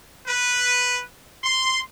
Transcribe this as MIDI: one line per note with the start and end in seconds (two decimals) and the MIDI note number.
0.27 1.01 71
1.44 1.80 84